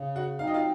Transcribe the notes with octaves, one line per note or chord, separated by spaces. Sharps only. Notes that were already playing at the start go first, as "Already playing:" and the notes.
Already playing: C#3
F#4 F#5
F#3 C4 D#4 F5
D#5
F4 F5